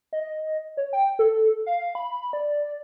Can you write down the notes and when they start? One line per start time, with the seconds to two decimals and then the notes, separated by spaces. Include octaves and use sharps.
0.13 D#5
0.77 C#5
0.93 G5
1.19 A4
1.66 F5
1.95 B5
2.33 D5